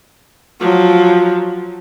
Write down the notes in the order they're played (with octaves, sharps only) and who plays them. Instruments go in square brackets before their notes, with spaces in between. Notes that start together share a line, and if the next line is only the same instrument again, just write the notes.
[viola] F3 F#3